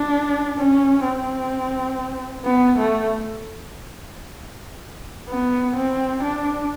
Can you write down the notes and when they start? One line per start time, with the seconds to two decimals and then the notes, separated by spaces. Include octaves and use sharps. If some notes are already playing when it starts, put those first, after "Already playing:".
Already playing: D4
0.58 C#4
1.05 C4
2.46 B3
2.78 A3
5.29 B3
5.76 C4
6.23 D4